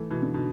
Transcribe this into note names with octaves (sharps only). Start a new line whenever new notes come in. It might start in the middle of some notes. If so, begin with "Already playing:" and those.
Already playing: E3 A3
B2 E3
D3
B2